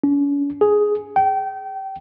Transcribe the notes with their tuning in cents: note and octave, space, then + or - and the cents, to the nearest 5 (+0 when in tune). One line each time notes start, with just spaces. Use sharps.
C#4 +40
G#4 +5
G5 -30